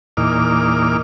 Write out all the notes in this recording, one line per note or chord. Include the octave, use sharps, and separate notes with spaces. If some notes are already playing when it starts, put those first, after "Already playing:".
E2 A#2 D#4 D6 F6